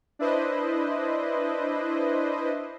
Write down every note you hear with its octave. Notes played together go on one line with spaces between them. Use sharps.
D4 E4 B4 C5 D#5